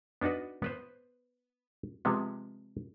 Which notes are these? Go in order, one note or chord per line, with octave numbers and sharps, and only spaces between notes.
B3 D4 D#4 F#4 B4
B3 B4 C5
C3 F3 G#3 B3